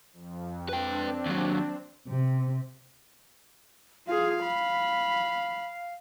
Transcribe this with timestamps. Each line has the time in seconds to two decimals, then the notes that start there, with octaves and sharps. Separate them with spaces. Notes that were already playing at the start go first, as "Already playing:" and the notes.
0.13 F2
0.69 C4 D4 B4 G5
1.26 D#2 F#3
2.09 C3
4.07 F4 G#4 F5
4.44 B5